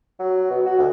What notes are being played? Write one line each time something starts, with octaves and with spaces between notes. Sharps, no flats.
F#3
B2
F#4
D2